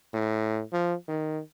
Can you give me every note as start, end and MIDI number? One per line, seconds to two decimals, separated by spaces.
0.13 0.61 45
0.73 0.94 53
1.08 1.40 51